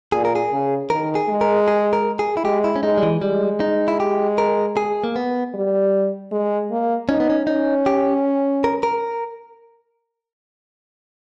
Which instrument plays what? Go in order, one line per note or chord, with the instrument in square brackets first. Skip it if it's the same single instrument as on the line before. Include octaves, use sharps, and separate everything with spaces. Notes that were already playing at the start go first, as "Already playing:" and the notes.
[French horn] A#2 [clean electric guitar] G#4
[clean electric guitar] A#4
G#4
[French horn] C#3
[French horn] D#3 [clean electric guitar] A#4
[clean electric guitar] G#4
[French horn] G#3
[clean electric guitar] A#4
G#4
A#4
G#4
E4
[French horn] G#3 [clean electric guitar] G4
[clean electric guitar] E4
C#4
[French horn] G#3 [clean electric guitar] D#4
[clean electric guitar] G3
E3
[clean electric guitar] G3 [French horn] G#3
[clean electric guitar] D#4
E4
G4
A#4
G#4
A#3
B3
[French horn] G3
G#3
A#3
[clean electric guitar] C#4 [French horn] D#4
[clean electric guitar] B3
C#4
[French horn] C#4 [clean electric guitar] D#4
[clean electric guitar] G4
A#4
A#4